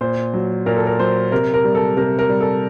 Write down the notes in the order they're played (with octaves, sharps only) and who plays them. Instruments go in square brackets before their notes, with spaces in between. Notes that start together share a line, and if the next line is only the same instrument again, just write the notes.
[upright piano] A#2 C5
F#3
A#2 A#4
A4
A#4
F#3 C5
C3 A#4
A#4
G3
A4
C3 A#4
A#4
G3
A4